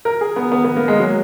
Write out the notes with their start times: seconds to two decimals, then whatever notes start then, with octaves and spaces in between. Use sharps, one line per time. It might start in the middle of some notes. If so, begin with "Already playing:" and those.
0.05 A#4
0.21 G#4
0.36 B3
0.52 B3
0.65 B3
0.76 A#3
0.88 G#3
1.00 F#3